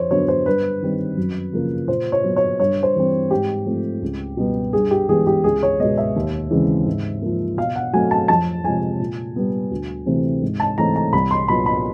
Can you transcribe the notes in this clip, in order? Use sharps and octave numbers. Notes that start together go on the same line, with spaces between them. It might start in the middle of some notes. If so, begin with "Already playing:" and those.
Already playing: F2 C5 C#5
D3 F#3 B3 C#5
C5
G2 B4
D#3 G3 C4
F#2
C#3 F3 A#3
A#2 C5
C#5
F#3 B3
C#5
G2 C#5
C5
E3 G3 C4
G#2 G4
F3 A3 C4
C#2
B2 G3 B3
G2 G#4
G4
E3 G#3 B3 G#4
G4
C#2 G#4
C#5
B2 G#3 B3 D#5
E5
D#2
C#3 E3 G#3 C4
G#2
F3 A#3
B2 F5
F#5
F#3 A3 C4 G#5
A5
F2 A5
C3 F3 G#3 G#5
A#2
G3 B3
D2
C3 E3 A3 C4
G#2
A5
E3 A3 C4 A#5
A#5
C2 B5
C6
A#2 F#3 B3 B5
B5